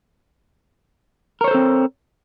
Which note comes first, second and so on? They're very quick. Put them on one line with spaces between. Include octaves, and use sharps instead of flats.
A#4 C#5 C5 A4 C4